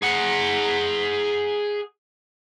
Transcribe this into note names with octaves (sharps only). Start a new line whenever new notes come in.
G#4 F#5